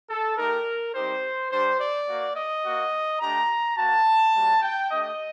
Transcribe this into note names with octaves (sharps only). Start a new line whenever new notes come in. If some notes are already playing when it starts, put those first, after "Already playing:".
A4
A3 D#4 G4 A#4
G3 C4 D#4 G4 C5
G3 D4 G4 C5
D5
A#3 F#4
D#5
A#3 F#4
A3 D4 G4 A#5
A#3 F#4 A5
G3 A#3 F#4
G5
A3 D4 G4 D#5